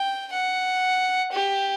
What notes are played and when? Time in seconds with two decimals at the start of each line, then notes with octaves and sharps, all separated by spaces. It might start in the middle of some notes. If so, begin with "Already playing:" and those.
Already playing: G5
0.33 F#5
1.32 G4